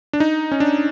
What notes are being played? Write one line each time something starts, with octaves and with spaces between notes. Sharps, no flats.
D4
D#4
C#4
D4